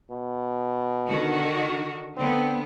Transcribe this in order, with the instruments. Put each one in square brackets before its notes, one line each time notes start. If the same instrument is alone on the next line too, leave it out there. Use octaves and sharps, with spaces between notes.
[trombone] B2
[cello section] D3 D#3 F#4
[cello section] D3 B3 [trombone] C4